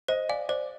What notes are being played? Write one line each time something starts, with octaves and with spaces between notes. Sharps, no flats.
C5 D#5
D5 F5 G#5
C5 D5